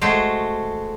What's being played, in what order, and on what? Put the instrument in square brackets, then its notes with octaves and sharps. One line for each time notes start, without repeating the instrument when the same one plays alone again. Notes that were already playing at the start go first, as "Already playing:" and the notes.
[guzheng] G#3 A3 F#4 C5 G5